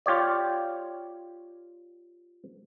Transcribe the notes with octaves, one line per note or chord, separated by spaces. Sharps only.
F4 G4 C#5 D5